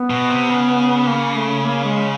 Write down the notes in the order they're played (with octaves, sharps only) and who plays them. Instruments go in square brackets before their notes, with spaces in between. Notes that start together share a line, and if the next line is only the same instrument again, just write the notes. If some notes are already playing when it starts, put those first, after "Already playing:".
Already playing: [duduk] B3
[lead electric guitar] B2
C3
C#3
[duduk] A#3
A3
A#3
G#3